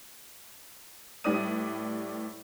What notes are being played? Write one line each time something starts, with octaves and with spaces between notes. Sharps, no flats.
A2 G3 B4 D5 D#6 D#7